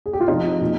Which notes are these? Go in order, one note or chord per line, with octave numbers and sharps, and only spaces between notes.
G#4
G4
F4
C3 F3 D#4
A#2